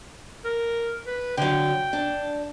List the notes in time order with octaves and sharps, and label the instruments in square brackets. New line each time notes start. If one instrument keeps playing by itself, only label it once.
[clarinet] A#4
B4
[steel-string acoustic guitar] D3 F#3 [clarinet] G5
[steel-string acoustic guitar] D4